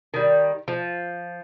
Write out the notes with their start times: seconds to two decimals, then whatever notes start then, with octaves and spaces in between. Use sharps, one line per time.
0.14 D#3 G3
0.68 F3